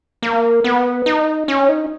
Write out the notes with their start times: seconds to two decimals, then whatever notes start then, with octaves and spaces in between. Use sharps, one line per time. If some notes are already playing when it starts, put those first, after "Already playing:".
0.22 A#3
0.64 B3
1.06 D#4
1.48 C#4
1.69 D#4